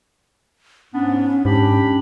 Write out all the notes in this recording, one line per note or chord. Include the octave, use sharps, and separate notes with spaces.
G#2 B3 C#4 D4
G#2 D4 G4 B5